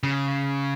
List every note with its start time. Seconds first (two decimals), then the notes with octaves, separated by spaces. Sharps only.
0.03 C#3